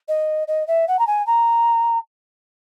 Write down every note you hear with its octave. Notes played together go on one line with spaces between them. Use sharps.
D#5
D#5
E5
F#5
A#5
G#5
A#5